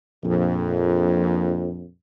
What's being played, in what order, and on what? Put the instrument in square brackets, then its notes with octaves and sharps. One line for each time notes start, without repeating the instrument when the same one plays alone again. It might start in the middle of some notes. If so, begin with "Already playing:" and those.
[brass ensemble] A#1 F2